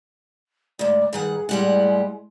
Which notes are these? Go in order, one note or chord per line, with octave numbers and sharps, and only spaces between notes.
D2 G#2 D5
G2 D#3 G#4 F#5
A2 G3 G#3 F#5